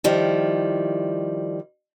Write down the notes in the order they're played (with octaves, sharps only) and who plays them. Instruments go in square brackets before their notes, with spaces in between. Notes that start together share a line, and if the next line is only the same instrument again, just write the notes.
[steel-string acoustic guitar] D#3 F3 G3 E4